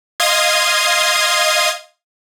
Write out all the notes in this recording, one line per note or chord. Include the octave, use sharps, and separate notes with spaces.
D#5 F5 C6 D#6 G#6